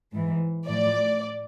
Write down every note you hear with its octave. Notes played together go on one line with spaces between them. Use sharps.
G#2 E3
A2 F3 D5